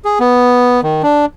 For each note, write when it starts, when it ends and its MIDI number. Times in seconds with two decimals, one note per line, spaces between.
0.05 0.19 68
0.20 0.81 59
0.83 1.02 51
1.03 1.26 62